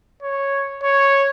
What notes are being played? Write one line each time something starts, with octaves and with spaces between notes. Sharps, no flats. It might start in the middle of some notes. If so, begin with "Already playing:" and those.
C#5
C#5